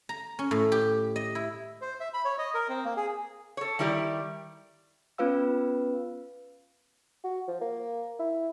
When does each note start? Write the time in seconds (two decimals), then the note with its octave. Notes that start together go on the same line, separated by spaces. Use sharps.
0.09 A#5
0.39 C#4
0.51 A2
0.72 G4
1.16 D#5
1.35 E4
1.82 C5
2.00 E5
2.14 B5
2.25 C#5
2.38 D#5
2.54 A#4
2.69 C4
2.85 A#3
2.97 G#4
3.57 A4 C#5
3.79 D#3 G3 E4 G4 D5
5.18 B3 C#4 F4 B4 F5 E6
7.24 F#4
7.48 F3
7.61 A#3
8.19 E4